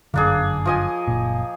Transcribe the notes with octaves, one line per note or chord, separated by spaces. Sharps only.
G1 F#2 D3 A#3 D4 G#4
F3 D#5 G#5
F#1 A#2